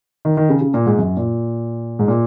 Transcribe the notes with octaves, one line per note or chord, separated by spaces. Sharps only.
D#3
D#3
C#3
C#3
A#2
G#2
F#2
A#2
G#2
A#2